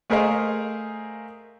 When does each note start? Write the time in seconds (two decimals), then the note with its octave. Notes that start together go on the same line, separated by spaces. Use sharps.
0.10 A3 G#4 A#4 C5 D#5 F5